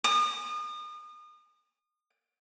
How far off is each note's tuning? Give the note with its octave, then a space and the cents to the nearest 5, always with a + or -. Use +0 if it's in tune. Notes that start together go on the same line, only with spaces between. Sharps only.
D#6 -35